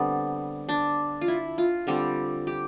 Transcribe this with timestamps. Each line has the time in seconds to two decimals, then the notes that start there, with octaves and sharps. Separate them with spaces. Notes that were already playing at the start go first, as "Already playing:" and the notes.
Already playing: D3 G3 B3 C4 D4
0.69 D4
1.21 F4
1.28 E4
1.58 F4
1.87 D3 G3 C4
2.47 G4